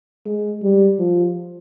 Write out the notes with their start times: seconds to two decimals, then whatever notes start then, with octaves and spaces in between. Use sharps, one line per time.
0.26 G#3
0.63 G3
0.99 F3